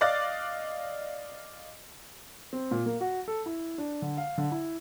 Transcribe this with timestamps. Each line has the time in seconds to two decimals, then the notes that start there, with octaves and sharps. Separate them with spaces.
0.01 D5 D#5 F5 D6 F#6 A6
2.53 C4
2.71 A#2
2.86 A#3
3.00 F#4
3.28 A4
3.46 E4
3.78 D4
4.02 D3
4.17 F5
4.38 D3
4.51 E4